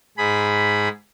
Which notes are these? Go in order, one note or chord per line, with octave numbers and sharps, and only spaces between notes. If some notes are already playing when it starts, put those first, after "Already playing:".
G#2 G#4 B5